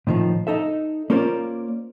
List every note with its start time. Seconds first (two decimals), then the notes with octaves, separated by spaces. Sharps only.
0.07 A2 D#3 F3
0.47 D#4 A4 E5
1.10 A#3 C#4 F4 A#4 C5 D5